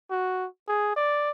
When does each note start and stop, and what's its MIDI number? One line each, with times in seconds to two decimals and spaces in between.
0.11 0.47 66
0.68 0.94 68
0.96 1.31 74